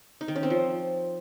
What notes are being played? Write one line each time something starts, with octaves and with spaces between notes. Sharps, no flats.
D#4
D#3
C#4
C4
F3